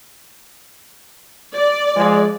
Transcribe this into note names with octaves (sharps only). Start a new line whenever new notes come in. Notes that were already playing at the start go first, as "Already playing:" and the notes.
D5
F3 G#3